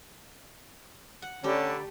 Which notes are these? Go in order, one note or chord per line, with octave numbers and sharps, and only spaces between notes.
F#5
D3 A3 C#4 G4 D5 A#5 B5